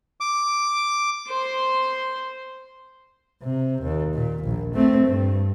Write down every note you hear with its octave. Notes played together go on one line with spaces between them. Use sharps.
D6
C5 C6
C3
D#2
A#2
A#1
A3 C4
G2